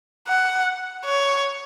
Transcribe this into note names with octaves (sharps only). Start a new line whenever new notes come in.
F#5
C#5